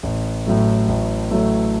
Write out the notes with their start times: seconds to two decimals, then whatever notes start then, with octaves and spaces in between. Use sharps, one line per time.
0.03 A1
0.46 A2 F#3 A3
0.88 A1
1.31 A2 F#3 A3